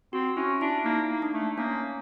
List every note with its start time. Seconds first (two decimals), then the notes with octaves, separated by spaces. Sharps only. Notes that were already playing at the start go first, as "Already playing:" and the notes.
0.13 C4 F#4
0.37 C#4 E4
0.61 D4 E4
0.85 A#3 D#4
1.10 A#3
1.22 D4
1.33 A3
1.58 A#3 C#4